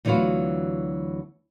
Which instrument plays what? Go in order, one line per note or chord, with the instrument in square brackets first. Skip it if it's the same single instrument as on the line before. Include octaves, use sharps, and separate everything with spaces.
[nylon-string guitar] D2 E3 F#3 B3 F4 F#4